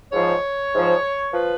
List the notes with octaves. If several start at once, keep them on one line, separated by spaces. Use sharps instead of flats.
G#2 F3 C#5
G#2 F3
F3 B4